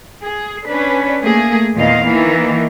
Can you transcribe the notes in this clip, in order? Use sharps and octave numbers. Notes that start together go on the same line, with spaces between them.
G#4
C#4 D4 B4
A3 A#3 G#4
E2 A#2 D#3 D#5 F5
D#3 E3 A#3